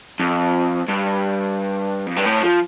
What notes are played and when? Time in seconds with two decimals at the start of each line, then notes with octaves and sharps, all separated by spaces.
0.20 F2
0.88 G2
2.07 F2
2.16 G2
2.25 A2
2.43 F3